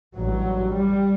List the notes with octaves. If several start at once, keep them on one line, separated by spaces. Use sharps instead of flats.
A1 G2 F#3
G3